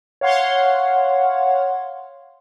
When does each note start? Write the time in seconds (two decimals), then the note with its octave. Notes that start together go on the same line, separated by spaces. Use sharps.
0.21 C#5 F5 F#5 C6